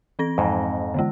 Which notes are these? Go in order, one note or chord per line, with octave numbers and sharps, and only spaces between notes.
E3 C4 A#6
F2 G#2
D3 E3 G#3